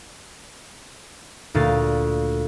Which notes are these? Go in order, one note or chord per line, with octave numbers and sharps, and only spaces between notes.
D2 A#2 F5 A6